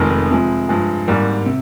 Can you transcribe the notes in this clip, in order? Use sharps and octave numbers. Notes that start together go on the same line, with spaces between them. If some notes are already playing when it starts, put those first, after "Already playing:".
Already playing: F1 F2 D#3 G#3
C3 F3 G#3
G2 F3 G#3
G#1 G#2 G3 A#3
C3